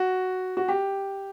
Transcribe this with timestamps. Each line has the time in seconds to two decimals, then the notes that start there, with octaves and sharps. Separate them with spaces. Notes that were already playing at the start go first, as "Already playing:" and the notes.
Already playing: F#4
0.57 F#4
0.68 G4